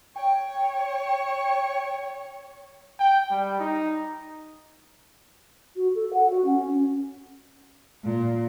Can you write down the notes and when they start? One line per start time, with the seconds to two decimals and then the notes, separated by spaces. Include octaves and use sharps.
0.16 C#5 G5
3.00 G5
3.31 G3
3.60 D#4
5.76 F#4
5.95 A4
6.13 F#5
6.30 F#4
6.45 C#4
6.59 C#4
8.04 A#2